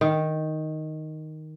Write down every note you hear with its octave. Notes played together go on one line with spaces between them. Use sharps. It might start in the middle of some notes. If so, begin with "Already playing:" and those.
D#3